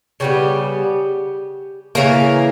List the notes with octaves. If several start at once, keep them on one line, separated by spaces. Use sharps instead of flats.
C#3 G3 B3 G4
C#3 E3 A#3 A#4